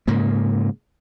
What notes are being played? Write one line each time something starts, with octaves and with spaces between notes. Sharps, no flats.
G#2 C#3 A#3